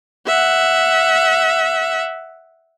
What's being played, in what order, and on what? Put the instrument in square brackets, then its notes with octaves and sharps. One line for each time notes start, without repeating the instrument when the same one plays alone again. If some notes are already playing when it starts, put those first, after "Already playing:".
[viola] E5 F#5